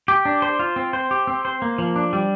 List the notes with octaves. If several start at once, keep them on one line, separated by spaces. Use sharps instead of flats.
G4
D4
C5
F4
C4
C5
G4
C4
C5
A#3
F3
D4
G3